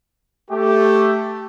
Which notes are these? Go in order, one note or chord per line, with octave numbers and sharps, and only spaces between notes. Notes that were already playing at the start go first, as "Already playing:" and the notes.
A3 G4